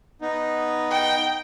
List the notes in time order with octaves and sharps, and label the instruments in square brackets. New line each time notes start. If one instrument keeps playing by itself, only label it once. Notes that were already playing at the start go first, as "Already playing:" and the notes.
[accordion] B3 D#4
[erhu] G5